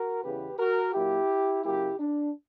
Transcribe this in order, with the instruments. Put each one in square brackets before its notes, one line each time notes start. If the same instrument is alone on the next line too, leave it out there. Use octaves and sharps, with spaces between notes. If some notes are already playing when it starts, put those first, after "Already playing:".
Already playing: [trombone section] F#4 A#4
E2 C#3 E3 B3 G4 B4
F#4 A#4
A#2 F#3 A#3 E4 G4
C#3 F#3 A#3 E4 G4
D4